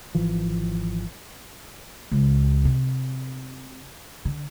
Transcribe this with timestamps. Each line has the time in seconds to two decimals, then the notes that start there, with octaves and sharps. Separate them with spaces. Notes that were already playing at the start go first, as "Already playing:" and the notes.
0.15 G#1 E3 F3
2.11 C#2
2.65 C3
4.25 D3